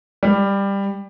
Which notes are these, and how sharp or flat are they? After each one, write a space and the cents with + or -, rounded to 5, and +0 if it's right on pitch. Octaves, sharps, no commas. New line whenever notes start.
G3 +15